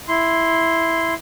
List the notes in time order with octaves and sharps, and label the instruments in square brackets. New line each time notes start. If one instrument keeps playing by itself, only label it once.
[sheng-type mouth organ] E4 C6